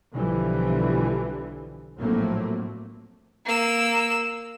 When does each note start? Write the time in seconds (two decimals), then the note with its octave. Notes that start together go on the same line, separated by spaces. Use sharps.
0.14 B1 B2 D3 E3 F3 G3
1.99 A#1 A2 F#3 A3 A#3 C4
3.46 A#3 E6